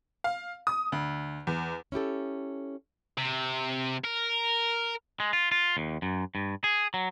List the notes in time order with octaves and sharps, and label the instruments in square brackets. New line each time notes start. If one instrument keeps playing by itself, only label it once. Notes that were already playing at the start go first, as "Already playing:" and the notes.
[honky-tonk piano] F5
D#6
D2
E2
[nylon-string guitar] C#4 E4 G4 A4
[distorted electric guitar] C3
A#4
[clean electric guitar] G#3
F4
F4
D#2
F#2
G2
G#4
F#3